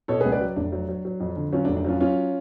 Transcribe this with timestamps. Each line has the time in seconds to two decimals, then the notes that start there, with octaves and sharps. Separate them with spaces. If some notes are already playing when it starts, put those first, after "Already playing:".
0.08 B2 A4 C#5
0.20 C#2 G#4 B4
0.32 B4 D5
0.41 F#3
0.56 F1 D4
0.72 F#3
0.89 F#3
1.05 F#3
1.20 F2
1.36 D3
1.52 F#3 C#4 F4
1.65 D4
1.68 F1
1.77 D4
1.85 F#3 C#4 F4
2.00 F#3 C#4 F4